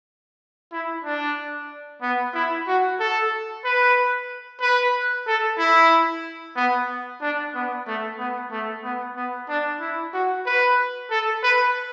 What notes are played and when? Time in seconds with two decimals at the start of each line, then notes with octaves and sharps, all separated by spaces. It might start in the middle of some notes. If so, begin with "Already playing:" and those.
0.72 E4
1.05 D4
2.02 B3
2.34 E4
2.68 F#4
3.00 A4
3.65 B4
4.61 B4
5.27 A4
5.59 E4
6.56 B3
7.22 D4
7.54 B3
7.87 A3
8.18 B3
8.51 A3
8.84 B3
9.16 B3
9.49 D4
9.80 E4
10.14 F#4
10.46 B4
11.11 A4
11.43 B4